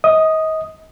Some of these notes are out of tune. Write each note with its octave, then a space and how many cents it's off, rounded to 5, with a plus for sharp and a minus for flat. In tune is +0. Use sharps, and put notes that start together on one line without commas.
D#5 +35 D#6 +0